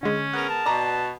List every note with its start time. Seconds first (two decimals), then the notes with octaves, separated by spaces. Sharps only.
0.03 D3 G#3 C#4
0.33 B3 G#4 A#4 F#5
0.50 A5
0.66 B2 D5 A#5